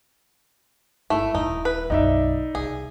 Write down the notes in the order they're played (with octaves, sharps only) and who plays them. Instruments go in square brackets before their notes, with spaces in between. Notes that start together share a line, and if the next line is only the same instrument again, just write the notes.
[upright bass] G1 [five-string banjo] A3 [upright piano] E4
[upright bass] D#1 [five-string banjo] D#4
[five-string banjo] B4
[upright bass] B1 F#2 [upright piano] D#4 D5 E5
[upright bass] C2 [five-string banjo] G#4